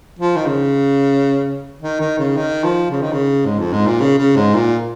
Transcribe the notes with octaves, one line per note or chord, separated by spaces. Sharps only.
F3
D#3
C#3
D#3
D#3
C#3
D#3
F3
C#3
D#3
C#3
G#2
F2
G#2
A#2
C#3
C#3
G#2
A#2